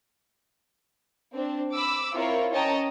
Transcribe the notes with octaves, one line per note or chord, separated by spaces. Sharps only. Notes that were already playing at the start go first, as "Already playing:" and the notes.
C4 D4
B5 D6 E6
C4 E4 F4 A#4 C5 C#5
C#4 C#5 D#5 G5 A5 A#5